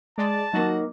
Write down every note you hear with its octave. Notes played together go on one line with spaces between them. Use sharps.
G#3 D5 A5
F#3 A#3 D#4 F#4